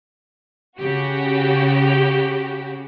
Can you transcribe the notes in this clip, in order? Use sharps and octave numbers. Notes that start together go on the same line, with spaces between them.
C#3 F#4 G4